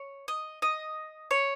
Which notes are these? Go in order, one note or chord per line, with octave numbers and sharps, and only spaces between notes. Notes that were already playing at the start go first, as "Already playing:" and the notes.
Already playing: C#5
D#5
D#5
C#5